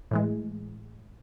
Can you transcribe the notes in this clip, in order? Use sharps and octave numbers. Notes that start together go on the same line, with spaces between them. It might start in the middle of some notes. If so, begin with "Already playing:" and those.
A2 E3 G#3